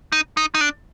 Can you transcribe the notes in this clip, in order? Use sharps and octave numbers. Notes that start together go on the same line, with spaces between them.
D#4
D#4
D#4
D4